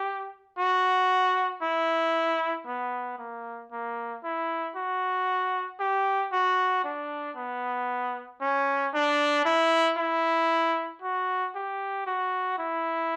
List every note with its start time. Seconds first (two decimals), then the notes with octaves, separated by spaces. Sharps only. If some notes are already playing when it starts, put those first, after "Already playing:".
Already playing: G4
0.58 F#4
1.62 E4
2.66 B3
3.19 A#3
3.71 A#3
4.24 E4
4.76 F#4
5.80 G4
6.33 F#4
6.84 D4
7.37 B3
8.41 C#4
8.94 D4
9.45 E4
9.97 E4
11.02 F#4
11.55 G4
12.06 F#4
12.58 E4